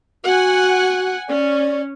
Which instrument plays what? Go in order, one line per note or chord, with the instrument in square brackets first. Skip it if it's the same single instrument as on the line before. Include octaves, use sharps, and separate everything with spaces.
[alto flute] F#4 [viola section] F#5 G#5
[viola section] C#4 [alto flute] D5